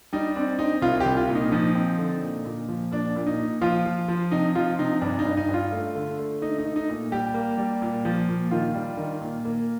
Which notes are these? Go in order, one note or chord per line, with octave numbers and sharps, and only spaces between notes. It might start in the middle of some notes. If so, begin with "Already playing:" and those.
G3 D#4
C4 D4
C4 D#4
C2 F4
G4
C2
F4
A#2
D#4
F3 D#4
C4
D3
A#2
A#2
F3
A#2 D4
A#2
D#4
A#2
F3 F4
F3
F3
C3 D#4
F3 F4
C3 D#4
G2 D4
D#4
G2
D#4
G2
F4
A3
D3
A3
A3 D#4
D#4
A3
D#4
A#2
G3 G4
A#3
G3
A#2
F3
A#2
D#3 F4
G3
D#3
A#2
A#3